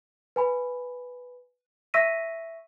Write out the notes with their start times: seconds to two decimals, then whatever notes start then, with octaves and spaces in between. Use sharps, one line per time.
0.36 B4 G#5 B5
1.94 E5 C#6 E6 A#6 B6 D#7